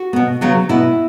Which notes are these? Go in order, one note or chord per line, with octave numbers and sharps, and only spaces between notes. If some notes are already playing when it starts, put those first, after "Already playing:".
Already playing: F#4
B2 B3
C#3 F#3 B3
B2 B3 E4